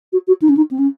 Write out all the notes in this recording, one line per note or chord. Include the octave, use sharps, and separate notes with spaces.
F#4
F#4
D#4
C#4
D#4
C4
C#4